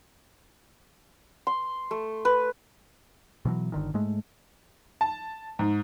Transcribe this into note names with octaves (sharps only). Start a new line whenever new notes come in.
C6
A3
B4
B2 E3 F#3
G1 D3 D#3
G#2 G#3 A3
A5
G#2